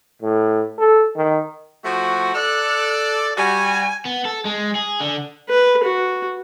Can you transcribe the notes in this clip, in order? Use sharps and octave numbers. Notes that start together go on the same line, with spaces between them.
A2
A4
D#3
F3 A3 F#4
A4 D5 F#6
G3 F#4 G#5
B3
A4
G#3
G#4
D3
B4
F#4